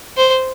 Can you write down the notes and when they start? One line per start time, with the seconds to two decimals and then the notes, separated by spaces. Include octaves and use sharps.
0.17 C5